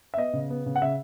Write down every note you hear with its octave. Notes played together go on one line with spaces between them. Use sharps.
E5
B3 D#5
C#3
B3
C#3
F#5
C#3 E5